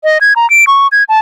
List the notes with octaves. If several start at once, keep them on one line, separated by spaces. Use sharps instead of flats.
D#5
G#6
A#5
D7
C#6
G#6
A5